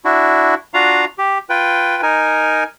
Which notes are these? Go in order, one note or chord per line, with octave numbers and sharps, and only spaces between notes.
D4 E4 F#4
D4 F4 F#4 F5 A#5
G4
F4 B4 G5
D#4 A#4 G#5